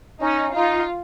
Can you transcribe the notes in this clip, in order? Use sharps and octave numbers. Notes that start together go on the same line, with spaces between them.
C#4 D#4
D#4 F4